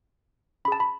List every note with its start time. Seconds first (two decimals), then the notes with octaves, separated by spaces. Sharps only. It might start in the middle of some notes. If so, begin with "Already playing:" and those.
0.65 C#4 B5
0.68 G#4 A5
0.80 B5